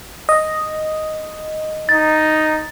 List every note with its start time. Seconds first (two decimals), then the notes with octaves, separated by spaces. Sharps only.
0.29 D#5
1.89 D#4 A6